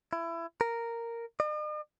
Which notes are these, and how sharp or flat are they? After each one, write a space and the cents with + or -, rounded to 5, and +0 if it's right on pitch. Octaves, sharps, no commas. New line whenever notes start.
E4 +25
A#4 -5
D#5 -45